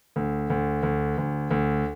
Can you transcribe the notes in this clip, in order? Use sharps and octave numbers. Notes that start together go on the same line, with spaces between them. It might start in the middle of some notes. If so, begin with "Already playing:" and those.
D2
D2
D2
D2
D2